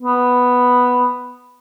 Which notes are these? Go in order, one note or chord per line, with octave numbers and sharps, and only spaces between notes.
B3